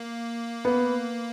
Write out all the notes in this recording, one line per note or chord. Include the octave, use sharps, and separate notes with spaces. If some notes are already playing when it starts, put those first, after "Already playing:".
Already playing: A#3
B3